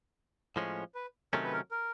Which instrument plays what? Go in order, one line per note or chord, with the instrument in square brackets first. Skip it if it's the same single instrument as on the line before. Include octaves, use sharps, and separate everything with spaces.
[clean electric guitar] A2 F3 G#3 C#4
[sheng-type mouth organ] B4
[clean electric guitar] C3 D#3 F#3 A3 C#4 [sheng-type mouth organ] A#4
[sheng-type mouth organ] B4
A#4
A#4